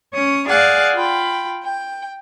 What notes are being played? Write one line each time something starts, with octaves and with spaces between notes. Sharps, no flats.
C#4 C#5 D#6
G#4 D5 F5 F#5 G#5
F4 G5 B5
G5